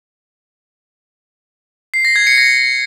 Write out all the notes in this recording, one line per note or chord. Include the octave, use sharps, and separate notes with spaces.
C7
A#6
G#6
C#7
A#6